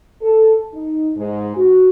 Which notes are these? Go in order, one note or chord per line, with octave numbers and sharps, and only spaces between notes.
A4
D#4
G#2
F#4